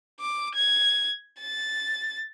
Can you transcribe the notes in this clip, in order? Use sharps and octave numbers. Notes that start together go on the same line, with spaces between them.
D6
G#6
A6